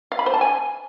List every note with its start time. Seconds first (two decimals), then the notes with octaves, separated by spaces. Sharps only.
0.12 F5
0.19 B5
0.26 C5
0.34 A5
0.41 G#5